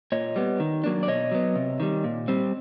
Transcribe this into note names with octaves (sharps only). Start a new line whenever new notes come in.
A#2 C#5 D#5
G3 B3
D#3
F#3 A#3 D4
D5
B2 C#5 D#5
F#3 B3
C3
D#3 G3
A#2
G3 C4